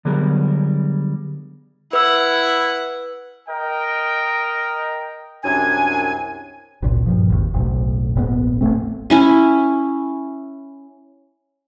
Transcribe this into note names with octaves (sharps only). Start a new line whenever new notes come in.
D3 F#3 G3 B3 G#4 A#4
E4 B4 F#5 E6
A#4 D#5 G5
C2 F#2 D4 G#5
G#1 C#2 A#2
G2 A#2 F3
G#1 D#2
F#1 B1 A2
D#1 A#1 G#2 B3
A1 D3 A3 C4
C#4 E4 G#5